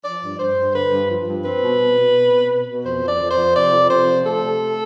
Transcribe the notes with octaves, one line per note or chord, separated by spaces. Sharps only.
F3 D5
G2
G2 C5
G2
D3 B4
G2
F3
G2
C4 B4
B2
B2
B2
C4
B2
B2
B2
F2 C5
F3
D5
F2
C5
F3
C3 D5
F2
C3 C5
F3
A3 A4
C3
A3